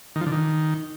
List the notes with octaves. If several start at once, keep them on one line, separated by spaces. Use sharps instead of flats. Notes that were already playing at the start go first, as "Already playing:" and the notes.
D#3
F3
D3
D#3